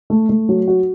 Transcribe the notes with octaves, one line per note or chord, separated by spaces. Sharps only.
A3
A3
F#3
F#4